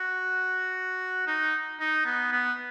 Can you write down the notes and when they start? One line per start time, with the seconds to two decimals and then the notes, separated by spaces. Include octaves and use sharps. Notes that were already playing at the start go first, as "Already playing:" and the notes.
Already playing: F#4
1.27 D#4
1.80 D#4
2.05 B3
2.32 B3